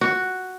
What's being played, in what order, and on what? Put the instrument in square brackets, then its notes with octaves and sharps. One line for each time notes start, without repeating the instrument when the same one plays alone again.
[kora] F#4